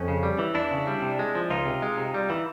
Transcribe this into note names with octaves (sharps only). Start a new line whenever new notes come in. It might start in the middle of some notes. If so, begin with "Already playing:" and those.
Already playing: F2 C#4
C#3
G3
E3
E2 D4 E4
C#3
G3
C3
G#3
F3
C#2 D#4 F4
C3
G#3
C3
G3
E3